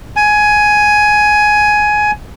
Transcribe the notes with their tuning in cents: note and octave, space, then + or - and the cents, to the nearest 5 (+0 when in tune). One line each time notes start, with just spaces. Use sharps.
G#5 +10